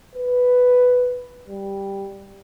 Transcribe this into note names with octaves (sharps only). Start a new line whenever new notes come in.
B4
G3